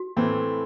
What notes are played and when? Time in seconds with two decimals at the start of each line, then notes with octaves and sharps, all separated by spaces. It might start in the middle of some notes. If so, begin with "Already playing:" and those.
Already playing: F#4
0.17 A2 E3 A3 C4